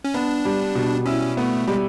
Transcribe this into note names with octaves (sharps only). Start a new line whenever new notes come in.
C#4
B3 D4
G3
B2
C#4 E4
A3 B3
G3 G#3